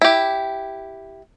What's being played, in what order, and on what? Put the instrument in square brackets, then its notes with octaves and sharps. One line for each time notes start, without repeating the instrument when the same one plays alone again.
[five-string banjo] E4 G4